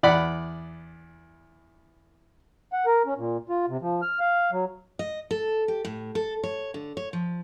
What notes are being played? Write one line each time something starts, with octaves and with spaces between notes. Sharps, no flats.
E2 D5 F#5 B5
F#5
A#4
C#4
A#2
F4
C3
F3
F6
F5
F#3
D#5
A4
G4
A2
A4
C#5
D3
C#5
F3